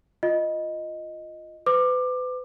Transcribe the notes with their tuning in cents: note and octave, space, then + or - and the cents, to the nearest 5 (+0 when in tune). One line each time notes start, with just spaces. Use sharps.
F4 +0 D#5 +0
B4 +35 D6 +20